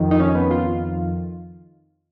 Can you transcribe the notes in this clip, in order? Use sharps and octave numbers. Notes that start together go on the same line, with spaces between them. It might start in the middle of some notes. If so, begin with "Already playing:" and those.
Already playing: F2 D#3
D#4
C#4
B3
F4